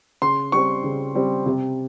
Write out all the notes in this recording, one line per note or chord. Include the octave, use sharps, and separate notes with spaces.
C#3 C6
G3 C4 C#6
C#3
G3 C4
C3